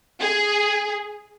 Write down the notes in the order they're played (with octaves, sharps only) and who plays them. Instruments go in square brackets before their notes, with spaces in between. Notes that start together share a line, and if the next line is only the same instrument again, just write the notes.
[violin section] G#4